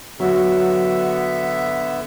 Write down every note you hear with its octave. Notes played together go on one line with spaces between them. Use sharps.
D3 F#3 B3 E5